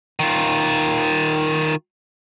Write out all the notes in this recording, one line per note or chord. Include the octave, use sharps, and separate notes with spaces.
D#3 F4